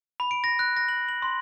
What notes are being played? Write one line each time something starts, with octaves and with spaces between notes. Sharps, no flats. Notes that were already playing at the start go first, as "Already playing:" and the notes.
B5
D7
A#6
F#6
A#6
F#7
F#7
C6